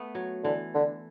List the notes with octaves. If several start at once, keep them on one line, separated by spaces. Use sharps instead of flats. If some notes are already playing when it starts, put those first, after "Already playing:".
Already playing: A3 B3
F#3
D3 E3
D3